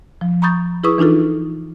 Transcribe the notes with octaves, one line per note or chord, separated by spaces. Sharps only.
F3
A#5 B5 C#6 D#6 G6 A6
E4 G#4 B4 C#6 D#6 E6
E3 D4 D#4 F4 A4